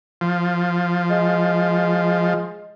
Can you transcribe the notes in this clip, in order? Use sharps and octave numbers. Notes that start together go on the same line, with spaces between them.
F3
G#3